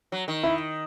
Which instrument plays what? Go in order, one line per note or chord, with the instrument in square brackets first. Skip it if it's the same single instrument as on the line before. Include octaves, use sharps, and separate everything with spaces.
[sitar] F#3
D#3
[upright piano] E4